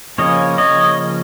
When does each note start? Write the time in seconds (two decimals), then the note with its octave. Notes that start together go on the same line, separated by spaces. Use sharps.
0.18 C#3 F3 A#3 C#4 C#5 D#5
0.58 C#5 D#5